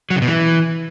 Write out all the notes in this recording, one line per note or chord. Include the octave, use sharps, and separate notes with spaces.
F#3
C#3
B2
E3